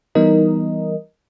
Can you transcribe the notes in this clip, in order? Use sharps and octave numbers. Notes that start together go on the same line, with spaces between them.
E3 G3 B3 D#4 A#4 D#5